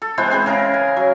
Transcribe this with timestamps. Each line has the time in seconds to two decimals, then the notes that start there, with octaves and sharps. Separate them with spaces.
0.02 A4
0.18 E3 G#3 B3 C5
0.30 G#3 C4 G#4 C5
0.46 C#3 A#4
0.74 G#5
0.97 F#3